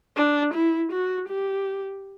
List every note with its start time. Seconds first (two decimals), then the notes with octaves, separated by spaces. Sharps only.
0.17 D4
0.54 E4
0.92 F#4
1.29 G4